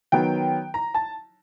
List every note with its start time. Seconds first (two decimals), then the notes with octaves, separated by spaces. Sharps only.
0.12 D#3 F#3 B3 G5
0.74 A#5
0.94 A5